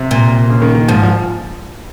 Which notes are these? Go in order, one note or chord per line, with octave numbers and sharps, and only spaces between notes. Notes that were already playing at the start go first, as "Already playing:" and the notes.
Already playing: C3
A#2
C#3
D#3
D#3
G#2 F3
F3